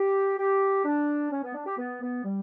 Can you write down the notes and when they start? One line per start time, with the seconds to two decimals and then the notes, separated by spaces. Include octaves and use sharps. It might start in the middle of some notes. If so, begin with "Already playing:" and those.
Already playing: G4
0.38 G4
0.85 D4
1.31 C#4
1.43 B3
1.54 D4
1.66 G4
1.78 B3
2.01 B3
2.24 G3